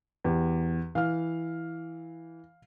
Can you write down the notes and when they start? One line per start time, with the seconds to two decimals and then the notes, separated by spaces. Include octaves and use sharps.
0.24 E2 G4
0.95 E3 F5 F6